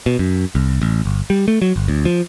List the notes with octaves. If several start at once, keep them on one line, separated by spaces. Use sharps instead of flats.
B2
F#2
C2
A1
G1
G3
A3
F#3
G1
D2
F3